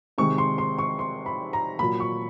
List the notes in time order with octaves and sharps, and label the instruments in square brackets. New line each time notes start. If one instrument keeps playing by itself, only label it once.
[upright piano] C3 D#3 G#3 C#6
C6
C6
C#6
C6
B5
A#5
A#2 F#3 A#3 B5
C#6